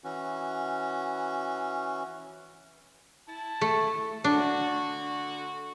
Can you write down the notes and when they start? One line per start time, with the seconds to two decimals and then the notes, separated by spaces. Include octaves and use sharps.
0.04 E3 C#4 F#4
3.28 E4 A5
3.61 A3
4.24 D3 D4 F#4